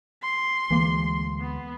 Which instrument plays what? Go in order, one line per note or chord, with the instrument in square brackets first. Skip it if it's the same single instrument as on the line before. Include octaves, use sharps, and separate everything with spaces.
[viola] C6
[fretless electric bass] D2 G#3 [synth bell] E3 A#3 G7
[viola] B3